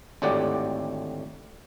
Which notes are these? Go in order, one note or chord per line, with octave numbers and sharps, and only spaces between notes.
G#1 D2 A2 G4 D5 F#5